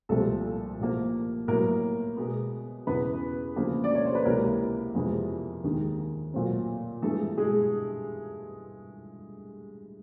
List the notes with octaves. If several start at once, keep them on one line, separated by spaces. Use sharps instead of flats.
C2 A#2 F3 A3 C4 A4
A2 F3 A#3
A2 F#3 A#3 B3 A#4
B2 G#3 B3
E2 C#3 E3 B3 B4
D2 C#3 F3 A#3
D5
C#5
C5
B4
C#2 C3 E3 A#3 A#4
F2 C3 E3 G#3 B3
D#2 D#3 G#3
A#2 F#3 A3 C4
G2 E3 G#3 A3 B3 A4
G#3 G#4